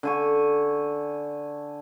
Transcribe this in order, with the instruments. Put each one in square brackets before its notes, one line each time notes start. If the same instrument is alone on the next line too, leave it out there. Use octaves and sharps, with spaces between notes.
[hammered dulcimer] D3 G#5 C#6